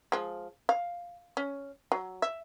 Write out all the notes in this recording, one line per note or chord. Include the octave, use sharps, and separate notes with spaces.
F3 G#3
F5
C#4
F#3
E5